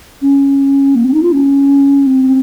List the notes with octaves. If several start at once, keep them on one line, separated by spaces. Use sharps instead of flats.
C#4
A#3
C4
D#4
F4
C#4
C4